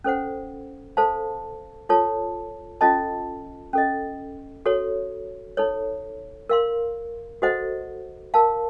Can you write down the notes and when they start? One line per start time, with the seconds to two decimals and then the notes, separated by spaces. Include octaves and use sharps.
0.04 C#4 A4 C5 F#5
0.97 A4 C5 F5 A5
1.89 F4 A4 C#5 A5
2.81 C#4 F4 A4 D#5 A5
3.73 C#4 A4 D#5
4.66 F#4 A4 C#5
5.57 D#4 A4 C#5
6.50 A#4 F5 C6
7.42 F#4 A4 C5 D#5 F#5
8.34 A#4 F5 A5